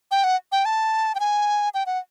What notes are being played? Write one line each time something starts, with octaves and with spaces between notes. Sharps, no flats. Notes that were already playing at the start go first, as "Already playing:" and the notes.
G5
F#5
G5
A5
G5
G#5
G5
F#5